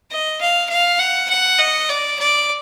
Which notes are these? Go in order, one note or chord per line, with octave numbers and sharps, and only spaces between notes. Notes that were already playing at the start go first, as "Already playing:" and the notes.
D#5
F5
F5
F#5
F#5
D#5
D5
D5